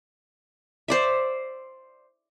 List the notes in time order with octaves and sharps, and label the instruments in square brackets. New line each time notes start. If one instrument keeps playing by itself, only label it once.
[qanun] C5 D5 E5